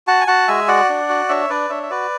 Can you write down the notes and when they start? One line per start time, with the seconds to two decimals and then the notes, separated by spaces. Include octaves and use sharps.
0.07 F#4 F#5 A5
0.21 G#5
0.27 F#4 F#5 A5
0.48 G#3 E5 G#5
0.68 F#4 D5 F#5
0.89 D4
1.09 F#4
1.29 D4 C#5 E5
1.50 D4 B4 D5
1.69 D4 C#5 E5
1.83 E5
1.90 F#4 B4 D5